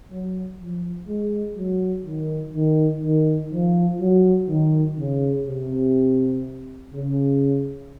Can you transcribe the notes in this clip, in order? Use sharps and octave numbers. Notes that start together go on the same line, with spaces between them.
F#3
F3
G#3
F#3
D#3
D#3
D#3
F3
F#3
D#3
C#3
C3
C#3